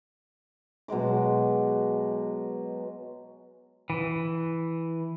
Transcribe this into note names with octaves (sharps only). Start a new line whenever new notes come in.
B2 F#3 G#3 D6
E3